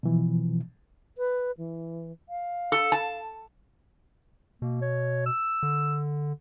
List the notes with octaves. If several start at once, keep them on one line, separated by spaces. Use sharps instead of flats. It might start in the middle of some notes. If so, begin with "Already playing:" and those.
B2 E3 F3
B4
E3
F5
A4
A5
B2 A#3
C#5
E6
D3